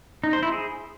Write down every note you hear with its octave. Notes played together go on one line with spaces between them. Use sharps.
D#4
C5
E4
G#4